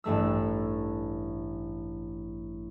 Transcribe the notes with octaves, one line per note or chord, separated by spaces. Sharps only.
A1 G2 A3 E6